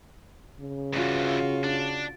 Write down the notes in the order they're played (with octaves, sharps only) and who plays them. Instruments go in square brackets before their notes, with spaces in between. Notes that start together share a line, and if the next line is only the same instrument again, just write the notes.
[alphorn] C#3
[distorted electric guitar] G2 E3 [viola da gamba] F4 F#4
[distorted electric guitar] D4